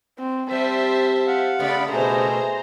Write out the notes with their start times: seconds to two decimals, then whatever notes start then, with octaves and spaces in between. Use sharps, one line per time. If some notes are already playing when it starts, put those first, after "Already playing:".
0.18 C4
0.51 G3 C4 C5 E5 A5
1.27 F5 F#5
1.59 C#3 A3 B3 D5 B5
1.91 B2 A3 G#4 C5 A#5